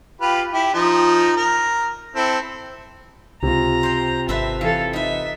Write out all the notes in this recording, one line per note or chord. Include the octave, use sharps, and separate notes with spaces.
F4 G4 B4
E4 G4
F3 D#4
A#4
C4 E4 A4
C#2 C3 F4 A#5
C5 G5
G#1 C4 A4 B4 E5
E3 A4 F5
D#4 B4 E5